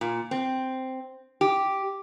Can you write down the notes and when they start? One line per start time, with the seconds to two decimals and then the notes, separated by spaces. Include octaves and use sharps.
0.01 A#2
0.31 C4
1.41 G4